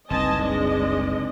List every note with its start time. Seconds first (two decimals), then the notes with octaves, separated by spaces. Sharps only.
0.10 F#1 C2 C4 D#4 B4 D#5 G#5 A5
0.42 G#3 D4 D#5